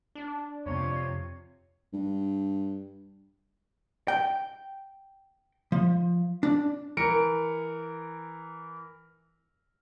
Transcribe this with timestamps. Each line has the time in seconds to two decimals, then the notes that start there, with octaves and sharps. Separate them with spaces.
0.15 D4
0.66 F2 C3 F3 C#5
1.93 G2
4.08 G5
5.72 F3
6.43 D4
6.97 E3 A#4 C#7 D7